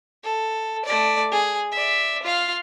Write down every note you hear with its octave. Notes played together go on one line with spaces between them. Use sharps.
A4
A3 D5
G#4
D5 E5
F4 F5